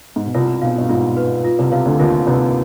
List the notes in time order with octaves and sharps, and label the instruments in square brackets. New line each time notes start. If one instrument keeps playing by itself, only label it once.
[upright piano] G#2
B2
[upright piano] C2 C3 [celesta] F4
[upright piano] B1 B2 [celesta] F5
[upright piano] G2
[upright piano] G#2 [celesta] F4
[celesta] B4
F4
[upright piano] C2 C3
[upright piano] C2 C3 [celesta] F5
[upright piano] D2 D3
[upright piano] D#2 D#3 [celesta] F4
[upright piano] C2 C3 [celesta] B4